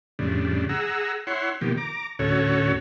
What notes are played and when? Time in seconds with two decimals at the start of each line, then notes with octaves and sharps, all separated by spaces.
0.19 F2 A2 C#3 G3 D4
0.69 G#4 F#5 A#5 E6
1.27 E4 C#5 F#5 C6
1.61 B2 D#3 F3 A#3 G4
1.77 A#5 D6
2.19 D2 A2 C#4 F#4 A4 C#5